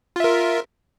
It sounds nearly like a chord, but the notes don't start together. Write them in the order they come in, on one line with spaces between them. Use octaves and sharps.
F4 E5 A#4